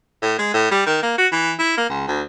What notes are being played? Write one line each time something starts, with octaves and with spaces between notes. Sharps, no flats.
A2
G#3
A2
G3
D#3
A#3
F#4
E3
E4
A#3
C#2
D2